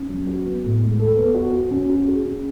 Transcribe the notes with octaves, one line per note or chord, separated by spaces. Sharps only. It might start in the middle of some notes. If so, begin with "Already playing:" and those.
Already playing: C#4
F#3
F#4
B3
A2
G#3
A4
B3
F#4
F#4
C#4
F#4
G#4
C#4